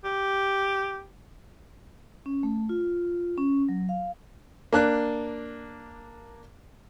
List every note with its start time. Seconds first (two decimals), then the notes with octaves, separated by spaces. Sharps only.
0.04 G4
2.26 C#4
2.43 A3
2.69 F4
3.38 C#4
3.69 F#3
3.89 F5
4.73 A#3 D4 F#6